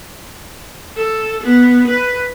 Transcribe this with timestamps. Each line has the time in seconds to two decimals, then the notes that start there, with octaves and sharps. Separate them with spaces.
0.96 A4
1.43 B3
1.88 B4